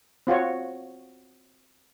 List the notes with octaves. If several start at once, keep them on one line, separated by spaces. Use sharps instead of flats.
C4 F4 F#4 C#5